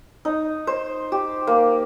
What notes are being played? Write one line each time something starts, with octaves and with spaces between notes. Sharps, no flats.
D#4
C5
G4
A#3